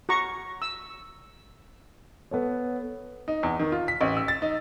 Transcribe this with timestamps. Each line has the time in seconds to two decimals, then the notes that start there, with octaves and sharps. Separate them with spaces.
0.09 F#4 A#5 C#6
0.62 E6
2.31 B3 A4 C#5
3.28 D#4
3.43 E2
3.60 D#3
3.72 F4
3.88 B6
4.01 A1
4.17 E6
4.28 A6
4.42 D#4